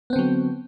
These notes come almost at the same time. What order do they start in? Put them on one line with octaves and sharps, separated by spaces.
B3 C4 D3 F#3